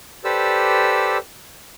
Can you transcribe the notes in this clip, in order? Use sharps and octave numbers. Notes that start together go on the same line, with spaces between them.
G4 A4 B4 C5 D5 E6